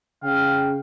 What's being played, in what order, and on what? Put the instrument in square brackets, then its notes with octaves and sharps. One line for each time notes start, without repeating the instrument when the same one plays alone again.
[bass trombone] C#3 [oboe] F5 [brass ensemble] G5